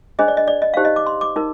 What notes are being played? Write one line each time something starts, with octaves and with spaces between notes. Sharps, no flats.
D4 G#4 C5 D#5
D5
D#5
D5
D#5
D#4 G4 C5 F5
D#5
D6
C6
D6
D#4 A#4